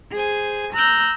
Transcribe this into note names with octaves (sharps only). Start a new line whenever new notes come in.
G#4 C5 G#5
A#5 E6 F#6 G6